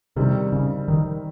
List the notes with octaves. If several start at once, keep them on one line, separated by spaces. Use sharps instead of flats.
C3 D#3 G3 C4
C#3
D#3